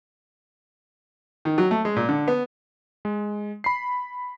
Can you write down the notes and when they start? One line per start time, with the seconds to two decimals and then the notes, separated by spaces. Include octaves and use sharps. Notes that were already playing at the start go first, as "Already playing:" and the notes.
1.45 D#3
1.58 F#3
1.71 A3
1.85 G#3
1.96 A#2
2.09 D3
2.28 B3
3.05 G#3
3.64 B5 C7